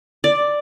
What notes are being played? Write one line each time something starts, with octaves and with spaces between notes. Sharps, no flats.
D5